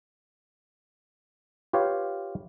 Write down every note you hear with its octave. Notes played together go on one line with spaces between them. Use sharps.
F4 G4 B4 C#5 F5